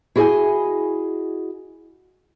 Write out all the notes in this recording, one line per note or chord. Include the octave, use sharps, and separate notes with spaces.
E4 F#4 G#4 D5 D#5 G#5